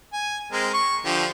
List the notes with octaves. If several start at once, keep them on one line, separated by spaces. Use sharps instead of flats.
G#5
G#3 C4 A#4
C#6
D3 F3 G4